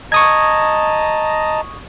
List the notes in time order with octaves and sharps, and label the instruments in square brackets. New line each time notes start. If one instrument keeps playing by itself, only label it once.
[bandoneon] D#5 A5 A#5 [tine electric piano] C#6 D#6 G#6